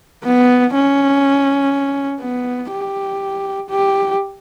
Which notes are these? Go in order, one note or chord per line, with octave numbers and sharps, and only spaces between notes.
B3
C#4
B3
G4
G4